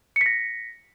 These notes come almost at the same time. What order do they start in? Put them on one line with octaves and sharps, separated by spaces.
C#7 B6 A#6